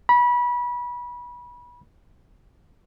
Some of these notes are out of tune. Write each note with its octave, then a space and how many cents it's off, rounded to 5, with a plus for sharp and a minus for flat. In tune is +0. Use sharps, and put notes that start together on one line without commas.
B5 -25